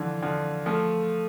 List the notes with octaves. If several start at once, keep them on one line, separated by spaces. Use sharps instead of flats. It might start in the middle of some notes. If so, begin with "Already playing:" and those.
Already playing: D3 E3 F3
D3 F3
F3 A3